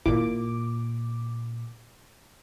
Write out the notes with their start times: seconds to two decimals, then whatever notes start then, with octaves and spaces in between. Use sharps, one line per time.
0.06 G#1 A#2 E4 D6